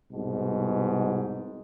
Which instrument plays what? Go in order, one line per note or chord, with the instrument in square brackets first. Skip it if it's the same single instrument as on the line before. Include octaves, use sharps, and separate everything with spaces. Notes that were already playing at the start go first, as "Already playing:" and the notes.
[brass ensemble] C2 G#2 B2